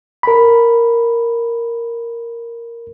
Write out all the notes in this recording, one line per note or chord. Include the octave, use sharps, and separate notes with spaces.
A#4 B5